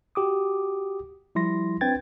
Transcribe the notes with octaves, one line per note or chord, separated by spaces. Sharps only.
F#4 G4 D6 D#6
F3 G3 E4 C6 A#6
C4 D4 B4 G5 G#6 A6